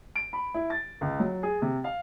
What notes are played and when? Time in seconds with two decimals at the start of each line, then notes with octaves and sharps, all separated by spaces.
0.16 D7
0.33 B5
0.54 E4
0.70 A6
1.01 C#2
1.19 F#3
1.43 G#4
1.62 C3
1.84 F5